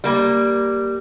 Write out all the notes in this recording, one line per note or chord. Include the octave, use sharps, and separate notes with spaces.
G3 A#3